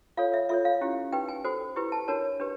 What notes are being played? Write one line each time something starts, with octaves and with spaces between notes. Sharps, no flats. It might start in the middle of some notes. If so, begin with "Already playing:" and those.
F4 A4 C#5 F5
E5
F4 A4 C#5 E5
F5
C#4 E4 G4
D#4 G4 B4 G5
G#5
F#4 A4 C5 G#5
E4 G4 B4
A5
D4 F#4 A#4 C#5 A5
D4 G4 B4